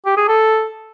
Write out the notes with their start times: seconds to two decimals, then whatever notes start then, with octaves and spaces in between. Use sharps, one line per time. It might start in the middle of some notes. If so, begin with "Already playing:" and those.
0.06 G4
0.17 G#4
0.28 A4